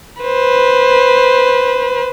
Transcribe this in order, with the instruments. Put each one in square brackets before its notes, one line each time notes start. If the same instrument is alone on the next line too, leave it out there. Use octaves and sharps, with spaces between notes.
[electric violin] B4 C5